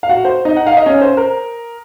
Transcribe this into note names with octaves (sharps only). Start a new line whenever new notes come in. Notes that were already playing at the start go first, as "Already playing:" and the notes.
F5
F#4 F#5
C5
D#4 D#5
F#5
F5
D#5
C#4 C#5
C5
A#4